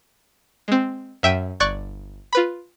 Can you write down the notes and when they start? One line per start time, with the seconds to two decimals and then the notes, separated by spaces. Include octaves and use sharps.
0.68 G#3 C4
1.23 F#2 E5 G5 D#7
1.60 G1 D5 C#6 F#6 G#6
2.33 F4 B4 B5